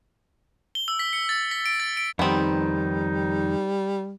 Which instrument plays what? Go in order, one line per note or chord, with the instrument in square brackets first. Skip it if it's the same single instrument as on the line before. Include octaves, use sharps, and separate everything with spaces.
[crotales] G7
E6
B6
C#7
A6
B6
D7
A6
D7
[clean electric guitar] F2 D#3 [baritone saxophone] G3 [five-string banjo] B3 C4 [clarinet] D#4